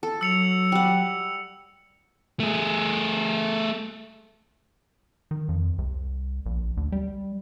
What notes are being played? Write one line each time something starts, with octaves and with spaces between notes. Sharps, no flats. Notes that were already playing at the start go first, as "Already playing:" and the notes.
A4
F#3 E6 C#7 F7
G3 F#5
A3 G#4
D#3
F2
C2
A#1
D2
G3